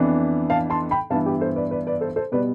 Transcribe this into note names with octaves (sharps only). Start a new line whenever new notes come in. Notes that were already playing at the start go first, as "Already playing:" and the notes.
Already playing: F2 E3 B3 D4
F5 A5
A5 C6
G5 B5
G2 E3 B3 E4 F5 A5
G4 B4
A4 C5
B4 D5
B4 D5
B4 D5
A4 C5
A4 C5
B2 G3 B3 B4 D5